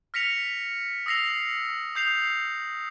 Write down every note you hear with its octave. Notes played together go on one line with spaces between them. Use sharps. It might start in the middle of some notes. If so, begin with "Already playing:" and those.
F6 A#6 B6 C#7 F7
D#6 E6 A#6 C7 F7
D#6 G6 C7 F7